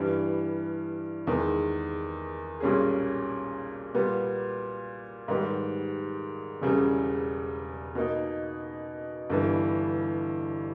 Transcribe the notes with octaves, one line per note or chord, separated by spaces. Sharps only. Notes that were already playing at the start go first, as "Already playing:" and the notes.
Already playing: G2 E3 G3
E2 D#3 G#3
B1 A#2 G3 C#4 G#4
A#2 G3 B3
G#2 D#3 G3 B3 G4
E1 E2 C#3 G3
B2 A#3 D#4
G1 G2 E3